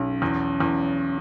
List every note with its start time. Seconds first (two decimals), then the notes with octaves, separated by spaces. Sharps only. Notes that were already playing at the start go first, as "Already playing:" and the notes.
Already playing: B1 C#4
0.22 E2
0.60 E2